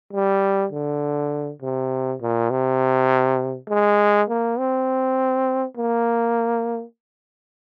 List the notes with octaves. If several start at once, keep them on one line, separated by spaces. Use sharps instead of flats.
G3
D3
C3
A#2
C3
G#3
A#3
C4
A#3